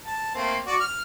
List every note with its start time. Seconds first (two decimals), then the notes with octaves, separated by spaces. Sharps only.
0.06 A5
0.35 A3 A#3 C4
0.66 F#4 D5
0.80 F6